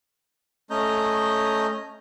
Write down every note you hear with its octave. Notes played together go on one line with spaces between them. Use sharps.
A3 C#4 D#5 A#5 G6